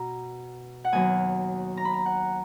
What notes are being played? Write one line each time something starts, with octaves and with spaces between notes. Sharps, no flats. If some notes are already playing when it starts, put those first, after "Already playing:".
Already playing: B2 A#5
F#5
D#2 D#3 F#3 B3 G#5
A#5
B5
A#5
F#5